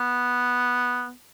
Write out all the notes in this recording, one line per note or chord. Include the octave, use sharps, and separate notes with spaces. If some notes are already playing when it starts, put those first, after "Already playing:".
Already playing: B3